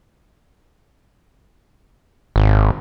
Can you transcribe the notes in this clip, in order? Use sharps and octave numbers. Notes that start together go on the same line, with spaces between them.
G#1